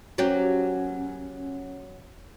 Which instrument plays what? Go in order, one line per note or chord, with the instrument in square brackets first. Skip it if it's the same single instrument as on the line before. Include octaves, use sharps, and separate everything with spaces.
[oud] F#3 A#3 G4 [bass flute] C#4